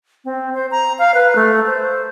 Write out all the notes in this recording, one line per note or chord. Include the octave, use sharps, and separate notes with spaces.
C4
C5
A#5
F5
B4
A3
C5